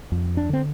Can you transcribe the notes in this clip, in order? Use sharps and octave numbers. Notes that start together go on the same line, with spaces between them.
F2
D4
D3 C4